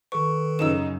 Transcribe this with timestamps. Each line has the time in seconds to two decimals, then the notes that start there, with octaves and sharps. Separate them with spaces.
0.12 D#3 A4 B4 C#6
0.59 F#2 C#3 D#4 E6 E7